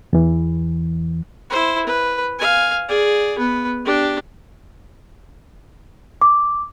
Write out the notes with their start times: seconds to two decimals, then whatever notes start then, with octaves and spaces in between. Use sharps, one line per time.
0.13 E2 E3
1.50 E4 C5
1.86 B4
2.39 F5 G#5
2.89 G#4 D5
3.38 B3 B4
3.85 D4 G4
6.22 D6